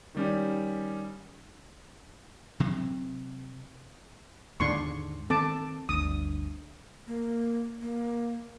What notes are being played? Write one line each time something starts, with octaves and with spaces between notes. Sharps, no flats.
D#3 G3 C#4
C3 F#3 C4
D#2 G#2 D3 D4 C6 C#6
D#3 C4 A4 A5 D6
G1 D2 D#6
A#3
A#3